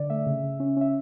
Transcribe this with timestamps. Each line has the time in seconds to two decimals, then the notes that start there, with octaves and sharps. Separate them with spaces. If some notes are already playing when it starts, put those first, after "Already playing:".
Already playing: D3 D5
0.10 A3 E5
0.26 C#3
0.43 C#3
0.60 C#4
0.77 C#4 E5